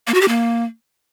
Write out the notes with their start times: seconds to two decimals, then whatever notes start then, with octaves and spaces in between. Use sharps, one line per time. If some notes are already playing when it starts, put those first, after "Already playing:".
0.07 A#3
0.14 F#4
0.21 G4
0.28 A#3